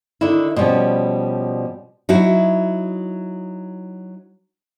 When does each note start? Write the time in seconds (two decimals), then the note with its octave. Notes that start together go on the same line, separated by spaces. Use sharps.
0.21 D3 D#3 E4
0.56 B2 F3 G3 B3 C#4
2.09 F#3 D#4 E4 F#4